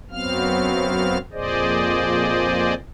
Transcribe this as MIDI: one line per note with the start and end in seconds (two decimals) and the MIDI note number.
0.11 1.18 42
0.11 1.18 54
0.11 1.18 59
0.11 1.18 60
0.11 1.18 77
0.11 1.18 89
1.33 2.74 41
1.33 2.74 46
1.33 2.74 68
1.33 2.74 72
1.33 2.74 74
1.33 2.74 75